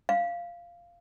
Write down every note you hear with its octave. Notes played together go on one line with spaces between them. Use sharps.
F5